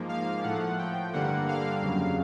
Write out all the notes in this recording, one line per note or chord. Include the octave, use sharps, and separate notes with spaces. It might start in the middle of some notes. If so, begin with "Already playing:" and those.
Already playing: G#2 F3 A#3
F5
A2 F3 A3 F#5
G5
G2 D3 G3 A#3 F#5
F5
F2 C#3 F#3